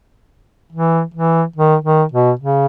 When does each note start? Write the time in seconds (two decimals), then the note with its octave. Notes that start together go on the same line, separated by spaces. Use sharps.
0.73 E3
1.14 E3
1.56 D#3
1.84 D#3
2.12 B2
2.40 C#3